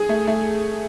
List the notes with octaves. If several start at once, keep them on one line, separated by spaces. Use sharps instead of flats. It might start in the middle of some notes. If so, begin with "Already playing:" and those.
Already playing: G#4
A3
A3